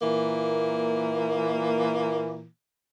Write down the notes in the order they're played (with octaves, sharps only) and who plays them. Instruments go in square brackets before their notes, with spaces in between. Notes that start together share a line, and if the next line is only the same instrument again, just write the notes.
[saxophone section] A#2 E3 A#3